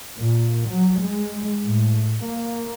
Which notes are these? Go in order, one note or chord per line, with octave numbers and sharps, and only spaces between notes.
A#2
F#3
G#3
A2
A#3